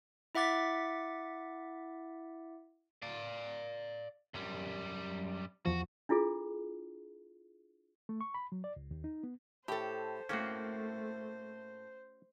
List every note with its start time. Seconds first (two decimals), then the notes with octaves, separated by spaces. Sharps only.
0.35 E4 E5 F#5 D6 A6 B6
3.02 D5 F5
4.34 F#2 G3
5.66 E2 F3 F#4
6.09 D4 E4 F4 G#4 A4
8.09 A3
8.21 C#6
8.34 B5
8.52 F#3
8.64 D5
8.76 C#2
8.91 D#2
9.04 D#4
9.23 B3
9.68 A2 G4 A4 C5
10.29 A2 A3 A#3 C4 C#4 F#4